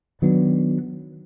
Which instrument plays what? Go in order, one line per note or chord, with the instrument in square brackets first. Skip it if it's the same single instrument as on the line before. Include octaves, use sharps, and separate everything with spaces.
[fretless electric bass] D#3 F#3 B3 D4